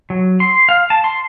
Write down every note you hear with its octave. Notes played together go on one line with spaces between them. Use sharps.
F#3
C6
F5
A5
C6